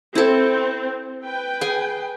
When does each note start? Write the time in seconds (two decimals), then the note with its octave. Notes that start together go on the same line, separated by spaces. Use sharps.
0.15 C4 E4 A4
1.24 B4 G5
1.61 G#4 G#5